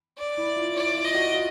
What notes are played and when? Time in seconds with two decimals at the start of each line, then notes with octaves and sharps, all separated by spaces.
0.18 D5
0.37 E4
0.56 F4
0.75 E4 D5
0.95 F4
1.05 D#5
1.14 F#4
1.33 F4